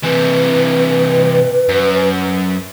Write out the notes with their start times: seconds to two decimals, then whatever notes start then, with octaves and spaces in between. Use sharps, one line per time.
0.03 C3 E3 B4
1.69 F#2